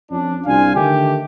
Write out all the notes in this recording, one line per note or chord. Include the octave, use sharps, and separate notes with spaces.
F2 C#4 D4
C2 D4 F4 F5 G#5
D3 D#3 A3 G4